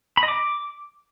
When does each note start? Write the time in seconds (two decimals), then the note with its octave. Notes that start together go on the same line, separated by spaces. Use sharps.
0.17 B5
0.23 D#5
0.28 D6